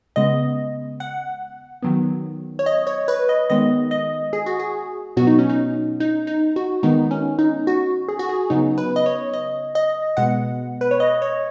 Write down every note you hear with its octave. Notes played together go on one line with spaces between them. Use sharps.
C#3 G#3 B3 D#5
F#5
D#3 F#3 B3
C#5
D#5
C#5
B4
D#5
D#3 G#3 B3 D#5
D#5
G#4
F#4
G#4
B2 F#3 B3 F#4
D#4
C#4
D#4
D#4
D#4
F#4
D#3 G#3 B3 D#4
C#4
D#4
F#4
G#4
F#4
G#4
C#3 F#3 B3 D#4
B4
D#5
C#5
D#5
D#5
B2 G#3 B3 F#5
B4
C#5
D#5
C#5